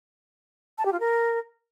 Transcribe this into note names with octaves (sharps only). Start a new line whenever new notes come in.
A5
G4
F4
A#4